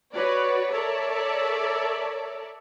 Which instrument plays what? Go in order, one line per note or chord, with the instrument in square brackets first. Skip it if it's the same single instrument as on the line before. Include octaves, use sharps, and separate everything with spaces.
[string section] F#4 B4 C#5 D5
A4 A#4 C#5 D5 E5